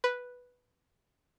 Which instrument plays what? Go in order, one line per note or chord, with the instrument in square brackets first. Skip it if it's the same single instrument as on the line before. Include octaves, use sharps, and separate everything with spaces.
[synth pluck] B4